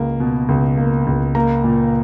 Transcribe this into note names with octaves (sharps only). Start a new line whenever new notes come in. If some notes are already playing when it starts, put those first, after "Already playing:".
Already playing: C#2 A#3
B2
C#2
A#3
C#2
A#3 A#5
A#2